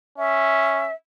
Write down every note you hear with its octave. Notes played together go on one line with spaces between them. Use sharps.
C#4 E5